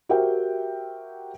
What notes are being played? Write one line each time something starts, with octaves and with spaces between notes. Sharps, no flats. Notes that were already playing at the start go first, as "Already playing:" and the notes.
F#4 G4 A#4 C5 E5 G5